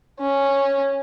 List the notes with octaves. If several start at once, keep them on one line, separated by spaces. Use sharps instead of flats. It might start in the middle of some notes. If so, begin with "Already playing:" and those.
C#4